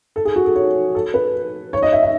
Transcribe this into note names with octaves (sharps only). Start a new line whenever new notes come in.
A4
G#4
F#4
A4
C#5
A4
B4
C#5
D#5
E5
E5